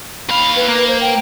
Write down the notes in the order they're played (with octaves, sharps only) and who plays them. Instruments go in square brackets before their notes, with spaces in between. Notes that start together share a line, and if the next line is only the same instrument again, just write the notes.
[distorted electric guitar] D#2 F5 [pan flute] B5
[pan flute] B4
[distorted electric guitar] A#3
[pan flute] C5
G5